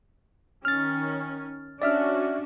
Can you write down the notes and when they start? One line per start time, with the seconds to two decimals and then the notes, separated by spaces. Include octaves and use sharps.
0.65 D#3 C#4 F6 A6
1.82 C#4 D4 F#4 D5 E5 F6